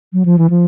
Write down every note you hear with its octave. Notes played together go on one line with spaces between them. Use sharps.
F#3
F3
E3
F3